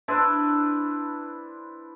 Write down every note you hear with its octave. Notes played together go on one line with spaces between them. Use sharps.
D4 E4 B4 C5